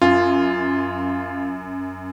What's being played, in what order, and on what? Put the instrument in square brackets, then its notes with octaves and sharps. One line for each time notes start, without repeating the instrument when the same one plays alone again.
[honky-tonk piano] F#2 [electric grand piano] F4